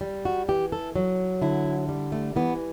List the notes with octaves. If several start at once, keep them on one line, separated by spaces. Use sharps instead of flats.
G3
F#4
E3 G4
A4
F#3
D3 E4
G3
A3
E3 B3